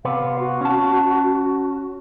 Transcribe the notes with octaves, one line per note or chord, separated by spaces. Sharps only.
C3 B3 B4 F5
F#4
C#4 A5